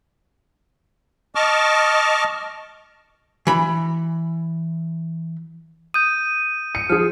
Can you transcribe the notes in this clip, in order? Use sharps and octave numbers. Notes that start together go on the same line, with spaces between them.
D#5 A5 C#6 D6 F6
E3 B5
D#6 G6 D#7
C#7
F3 G#4 F6